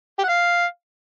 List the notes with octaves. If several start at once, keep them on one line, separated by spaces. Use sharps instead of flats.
G4
F#5
F5